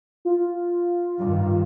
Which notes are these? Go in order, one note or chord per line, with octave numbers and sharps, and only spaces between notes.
F4
G2 D#3